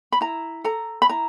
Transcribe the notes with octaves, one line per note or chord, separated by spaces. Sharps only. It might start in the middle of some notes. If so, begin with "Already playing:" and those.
B5
E4 A#5
A4 A#5
B5
E4 A#5